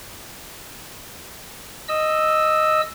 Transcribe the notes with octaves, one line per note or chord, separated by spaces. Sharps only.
D#5 E6